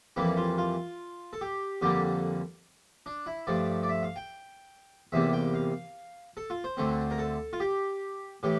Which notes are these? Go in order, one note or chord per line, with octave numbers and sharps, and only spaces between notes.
F2 E3 G3 A#3 E4
F4
F4
A4
G4
F2 D3 G3 A#3 G4
D4
E4
G2 F3 A3 D5
D5
E5
F5
G5
E2 C3 G3 A#3 E5
G5
F5
A4
F4
C5
D2 D3 A3 C4
A#4
A4
F4
G4
A2 E3 G4